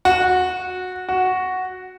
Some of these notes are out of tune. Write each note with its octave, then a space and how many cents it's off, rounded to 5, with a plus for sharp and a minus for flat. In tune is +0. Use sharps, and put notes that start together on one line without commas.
F#4 -15
F#4 +0